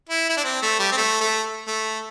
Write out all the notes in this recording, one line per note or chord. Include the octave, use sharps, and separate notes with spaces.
E4
E4
D4
C4
A3
G3
C4
A3
A3
A3